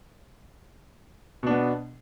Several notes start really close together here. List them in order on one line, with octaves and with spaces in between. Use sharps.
B2 D4 B3